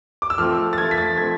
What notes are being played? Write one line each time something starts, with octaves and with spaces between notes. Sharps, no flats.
D6
E6
F3 A3 C4 F6
A6
F3 A3 C4 G#6
B6
A6
F3 A3 C4 G#6